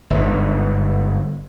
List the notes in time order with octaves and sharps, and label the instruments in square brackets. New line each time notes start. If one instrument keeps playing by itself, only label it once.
[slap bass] G1 G#2